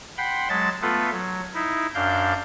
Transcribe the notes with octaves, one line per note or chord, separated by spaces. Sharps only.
F#5 G5 B5 C6
F#3 G#3 A5 A6
A3 B3 F4 A4 B4
F#3
D#4 E4
F#2 D4 F5 G6